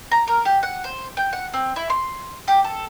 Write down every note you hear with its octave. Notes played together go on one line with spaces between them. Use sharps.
A#5
A#4
G4
F#5
C5
G5
F#5
C4
E4
C6
G4
A4